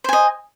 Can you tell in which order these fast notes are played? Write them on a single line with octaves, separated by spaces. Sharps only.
C5 G#5 D#5